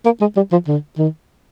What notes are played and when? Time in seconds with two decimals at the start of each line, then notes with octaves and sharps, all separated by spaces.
0.05 A#3
0.21 G#3
0.36 G3
0.52 F3
0.67 D3
0.98 D#3